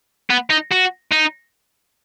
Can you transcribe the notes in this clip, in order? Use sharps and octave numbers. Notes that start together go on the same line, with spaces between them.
B3
D#4
F#4
D#4